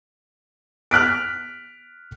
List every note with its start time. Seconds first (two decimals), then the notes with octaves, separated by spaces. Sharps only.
0.91 F6 F#6 B6 D7